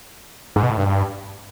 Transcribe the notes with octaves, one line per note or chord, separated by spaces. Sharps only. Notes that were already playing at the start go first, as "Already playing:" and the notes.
G#2
B2
A2
G2